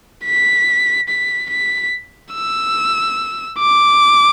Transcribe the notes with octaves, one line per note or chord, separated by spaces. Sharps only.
B6
B6
B6
E6
D6